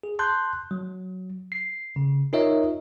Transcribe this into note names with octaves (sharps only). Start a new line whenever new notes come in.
G#4
A5 C6 F#6 G6
F#3
C7
C#3
D#4 F4 A#4 C#5 D#5 E5